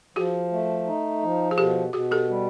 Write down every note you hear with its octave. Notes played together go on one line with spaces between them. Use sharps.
F3 F#4 G#4
A3
D#4
F3
G#4
B2 G4 A4
B2 F#4 G#4
G4 A4
G3